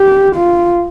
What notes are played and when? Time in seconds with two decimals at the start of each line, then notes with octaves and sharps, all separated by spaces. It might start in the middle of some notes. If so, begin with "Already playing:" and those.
Already playing: G4
0.36 F4